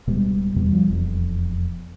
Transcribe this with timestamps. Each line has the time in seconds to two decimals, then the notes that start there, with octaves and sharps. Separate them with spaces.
0.07 D1 B2 G3 G#3
0.56 E2 B2 G3
0.72 F3 G3
0.88 E1 F2